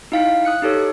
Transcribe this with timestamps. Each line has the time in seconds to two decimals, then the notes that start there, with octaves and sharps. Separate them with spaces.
0.12 D#4 E4 F5 G5 B6 C#7
0.45 D#6 F#6 C#7
0.62 D#4 G4 A4 C#5